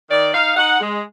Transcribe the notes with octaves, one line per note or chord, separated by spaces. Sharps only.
D#3 D5
D#4 F5
D#4 F#5
G#3